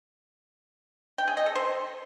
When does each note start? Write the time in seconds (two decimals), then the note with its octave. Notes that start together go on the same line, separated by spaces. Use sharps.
1.18 G5
1.28 G#4
1.37 D#5
1.46 A4
1.55 C5